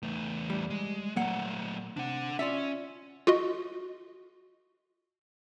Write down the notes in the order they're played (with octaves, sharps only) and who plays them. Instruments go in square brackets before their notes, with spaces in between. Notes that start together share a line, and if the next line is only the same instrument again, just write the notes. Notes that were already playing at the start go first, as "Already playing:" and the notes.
[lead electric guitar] E2 A3
[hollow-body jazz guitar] G3
[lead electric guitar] G#3
[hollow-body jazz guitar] A#2 A#3 F#5 [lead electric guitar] F#3 A3
[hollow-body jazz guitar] C3 [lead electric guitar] D4 F#5
[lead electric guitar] C#4 [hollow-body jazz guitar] F4 D5 E5
[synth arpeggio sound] F4 F#4 D#5